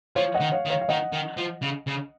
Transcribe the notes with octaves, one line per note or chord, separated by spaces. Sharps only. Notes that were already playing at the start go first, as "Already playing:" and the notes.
F3 C#5 F5
D#5 F#5
D#3
C#5 F5
D#3
C#5 F5
F5
D#3 D#5 F#5
D#3
F3
C#3
C#3